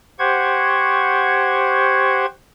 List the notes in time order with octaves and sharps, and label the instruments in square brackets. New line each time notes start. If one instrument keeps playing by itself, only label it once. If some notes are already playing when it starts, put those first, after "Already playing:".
[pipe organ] G4 C5 F#5 C#6 G#6